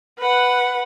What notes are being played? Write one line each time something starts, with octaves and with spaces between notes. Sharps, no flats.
B4 F#5